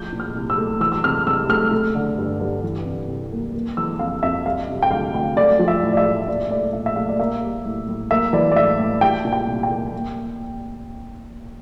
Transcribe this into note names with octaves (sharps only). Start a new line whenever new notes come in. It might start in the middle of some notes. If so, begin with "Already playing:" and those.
Already playing: A2 F3 G6
A#2
F6
C2
E6
A3
E3 E6
E6
C3 F6
C2 E6
A3 F6
A3
D3
G2
G2
E3
C3
C2
A#3
A#3
E3 E6
F2 F5
F2 E5
G3 F5
C3
G5
D2 F5
D2
A3 D5
F3
E5
A2
D5
E5
A2
A#2 D5
A3 D5
A#2 E5
E5
A3 F5
D5
A#3 E5
G3
A2
A2
A#3 E5
E3 D5
D5
A2 E5
A2
G3 G5
A#2
G5
C2
G5
A#3
A#3